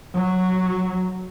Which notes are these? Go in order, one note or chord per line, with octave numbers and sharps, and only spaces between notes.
F#3